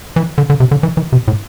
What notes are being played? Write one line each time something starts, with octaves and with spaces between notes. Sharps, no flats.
E3
D3
D3
C3
D3
E3
E3
C3
A2